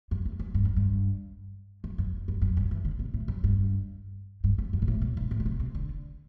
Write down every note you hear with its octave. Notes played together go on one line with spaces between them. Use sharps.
F#2
E2
F#2
G2
F#2
G2
F#2
F#2
F#2
F#2
G2
E3
D3
B2
A2
F#2
G2
G2
E2
F#2
B2
A2
B2
G2
A2
D3
C3
C3
D3